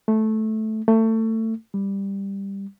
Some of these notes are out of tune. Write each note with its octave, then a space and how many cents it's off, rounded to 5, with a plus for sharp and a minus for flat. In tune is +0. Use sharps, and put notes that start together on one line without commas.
A3 -10
A3 +25
G3 +10